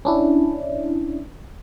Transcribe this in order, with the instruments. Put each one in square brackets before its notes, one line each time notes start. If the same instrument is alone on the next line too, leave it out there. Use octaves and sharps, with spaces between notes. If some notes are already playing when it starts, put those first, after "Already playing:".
[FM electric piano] C#4 D4 E4